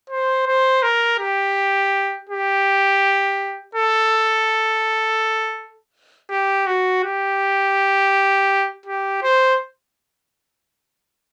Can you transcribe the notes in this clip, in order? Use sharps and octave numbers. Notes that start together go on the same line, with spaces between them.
C5
C5
A#4
G4
G4
A4
G4
F#4
G4
G4
C5